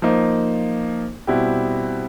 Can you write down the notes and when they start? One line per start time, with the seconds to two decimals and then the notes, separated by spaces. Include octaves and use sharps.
0.02 F3 A#3 D#4
1.27 B2 G3 C4 E4 G4